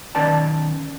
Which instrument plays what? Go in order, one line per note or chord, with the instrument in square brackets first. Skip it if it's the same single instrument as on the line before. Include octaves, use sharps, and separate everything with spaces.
[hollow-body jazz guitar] B1 D#3 C#4 B4 D5 A5